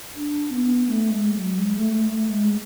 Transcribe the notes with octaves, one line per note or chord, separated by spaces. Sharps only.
D4
B3
A3
G#3
F#3
G#3
A3
A3
A3
G#3